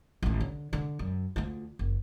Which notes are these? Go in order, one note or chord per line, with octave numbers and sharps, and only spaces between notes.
A1 D#2
D3
D3
F#2
D2 F4
F#1